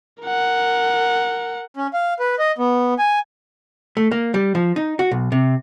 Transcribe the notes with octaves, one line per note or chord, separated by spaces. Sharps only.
A#4 F#5
C#4
F5
B4
D#5
B3
G#5
A3
A#3
G3
F3
D#4
F#4
B1
C3